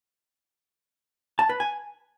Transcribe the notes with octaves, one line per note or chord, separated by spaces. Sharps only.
A5
B4
G#5